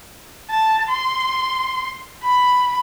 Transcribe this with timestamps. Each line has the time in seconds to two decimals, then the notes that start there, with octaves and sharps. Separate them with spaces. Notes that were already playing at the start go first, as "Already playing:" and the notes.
0.51 A5
0.89 C6
2.23 B5